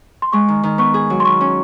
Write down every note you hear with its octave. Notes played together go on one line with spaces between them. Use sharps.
C6
G#3 C#6
D#3
D#3
B3 C#6
G#4
F#3
C6
D#3 C#6
C#4